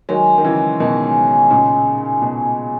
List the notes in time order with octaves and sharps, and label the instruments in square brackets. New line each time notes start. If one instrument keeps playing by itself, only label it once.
[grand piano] D#3 F#3 [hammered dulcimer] G#3
[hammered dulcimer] G#4
[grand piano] D#3
C#3 E3
[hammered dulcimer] G#3
[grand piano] B2 D#3 [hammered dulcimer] D#4
[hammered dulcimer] G#3
G#4
[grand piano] A#2 C#3 [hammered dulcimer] G#3
[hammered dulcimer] D#4
G#3
[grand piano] B2 [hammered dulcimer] G#4
[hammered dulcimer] G#3